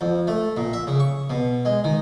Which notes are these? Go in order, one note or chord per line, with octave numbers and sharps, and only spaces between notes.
F2
A3
A#2
E5
C#3
C#6
B2
G#3
D#3